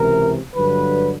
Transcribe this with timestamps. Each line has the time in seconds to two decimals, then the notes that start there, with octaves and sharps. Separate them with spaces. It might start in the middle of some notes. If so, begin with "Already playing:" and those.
Already playing: C#2 C3 E3 A#4
0.55 G2 D3 F#3 B4